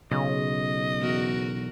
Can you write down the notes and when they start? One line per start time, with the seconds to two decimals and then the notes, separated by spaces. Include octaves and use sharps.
0.12 B1 C#3 D#5
1.00 E2 F#4 A#4